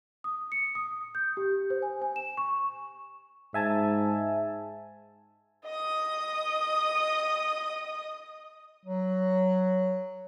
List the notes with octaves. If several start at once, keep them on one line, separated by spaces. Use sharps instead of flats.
D#6
C#7
D#6
G6
G4
C5
G#5
G#5
E7
C#6
G#2 E5 G#5 A5
D#5 D#6
F#3